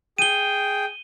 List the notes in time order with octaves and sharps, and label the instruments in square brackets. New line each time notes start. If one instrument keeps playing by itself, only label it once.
[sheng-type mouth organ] G#4 G5 [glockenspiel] D#7 G7